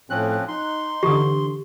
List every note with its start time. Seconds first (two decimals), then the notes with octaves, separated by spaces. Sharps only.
0.10 A2 F3 C4 C#4 F#6
0.48 D#4 C6
1.03 D3 E3 G4 D#6